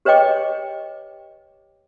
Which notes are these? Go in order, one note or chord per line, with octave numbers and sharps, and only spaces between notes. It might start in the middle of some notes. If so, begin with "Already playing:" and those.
G4 B4 C#5 D#5 G5 D6